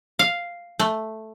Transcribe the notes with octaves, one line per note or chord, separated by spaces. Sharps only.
F5
A3